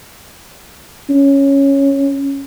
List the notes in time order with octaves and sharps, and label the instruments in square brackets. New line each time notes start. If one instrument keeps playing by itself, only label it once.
[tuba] C#4